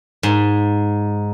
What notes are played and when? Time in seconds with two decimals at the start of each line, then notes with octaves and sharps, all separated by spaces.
0.23 G#2